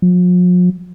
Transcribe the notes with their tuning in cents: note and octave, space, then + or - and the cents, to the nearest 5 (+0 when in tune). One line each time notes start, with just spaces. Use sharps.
F3 +45